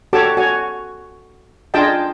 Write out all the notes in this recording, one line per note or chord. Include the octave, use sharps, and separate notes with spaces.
F#4 G4 A4 C#5 A5 D6
F#4 C#5 G#5
D4 F4 G#4 D#5 G5 A5